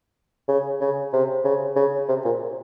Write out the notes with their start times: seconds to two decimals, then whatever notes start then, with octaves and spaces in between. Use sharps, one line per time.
0.48 C#3
0.80 C#3
1.13 C3
1.45 C#3
1.76 C#3
2.09 C3
2.25 A#2